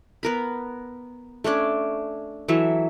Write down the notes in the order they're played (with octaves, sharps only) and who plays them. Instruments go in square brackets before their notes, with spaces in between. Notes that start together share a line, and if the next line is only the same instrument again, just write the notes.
[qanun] B3 A#4 B5
A3 C#4 D4 D5
E3 F#3 A4 E5